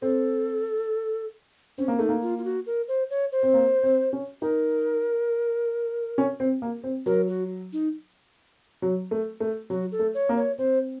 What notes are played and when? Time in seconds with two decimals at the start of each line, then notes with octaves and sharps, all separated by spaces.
0.02 C4 A4
1.78 C4 C#4
1.88 A#3
1.99 A3 D#4
2.09 A#3
2.22 F4
2.38 F4
2.44 F#4
2.66 A#4
2.88 C5
3.10 C#5
3.32 C5
3.43 C4
3.54 A#3
3.83 C4
4.13 C#4
4.42 D#4 A#4
6.18 C#4
6.40 C4
6.62 A#3
6.83 C4
7.06 F#3 A#4
7.28 F#4
7.73 D#4
8.82 F#3
9.11 A3
9.40 A3
9.70 F#3 F#4
9.92 A4
9.99 A3
10.14 C#5
10.29 A#3
10.37 C#5
10.58 C4 C5